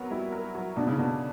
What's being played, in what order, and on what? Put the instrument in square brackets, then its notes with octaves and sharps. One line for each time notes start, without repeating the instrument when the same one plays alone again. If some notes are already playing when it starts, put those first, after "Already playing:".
Already playing: [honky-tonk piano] F#3 B3 A#4
[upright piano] G3 [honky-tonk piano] E4
[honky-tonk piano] A#4
F#3
[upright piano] B2 [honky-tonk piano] D4
[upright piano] C#3
[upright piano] B2 [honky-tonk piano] D3